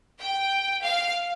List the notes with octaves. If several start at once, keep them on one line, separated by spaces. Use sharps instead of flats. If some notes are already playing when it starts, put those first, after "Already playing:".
G5
F5